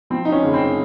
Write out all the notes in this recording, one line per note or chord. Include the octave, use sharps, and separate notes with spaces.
F3 C4
D#4
C#4
F#1
C4